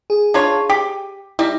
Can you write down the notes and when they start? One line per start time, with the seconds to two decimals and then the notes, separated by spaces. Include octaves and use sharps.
0.10 G#4
0.34 D4 F4 C#5
0.70 G4
1.39 G3 D#4 E4